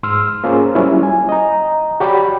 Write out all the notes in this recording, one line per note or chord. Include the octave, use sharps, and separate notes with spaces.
G#2 C6 E6 F6
A#3 C#4 F4 G#4 C5
F#3 G3 A#3 C#4 E4
G#5
D#5 A#5
F#4 G4 C#5 D5 G5 B5